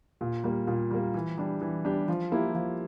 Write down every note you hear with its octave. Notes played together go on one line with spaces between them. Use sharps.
A#2
G3 A#3
A#2
G3 A#3
E3
G3 D4 G4
E3
G3 D4 G4
F3
A#3 E4 G4
F3